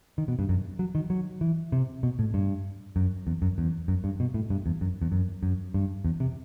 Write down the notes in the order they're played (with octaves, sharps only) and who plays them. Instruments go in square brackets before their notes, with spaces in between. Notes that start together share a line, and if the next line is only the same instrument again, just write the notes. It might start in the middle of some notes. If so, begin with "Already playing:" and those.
[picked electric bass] D#3
B2
G2
F#2
F#3
D#3
F#3
E3
C3
B2
A2
G2
F#2
E2
F#2
E2
F#2
G2
B2
A2
G2
E2
F#2
E2
F#2
F#2
G2
E2
C3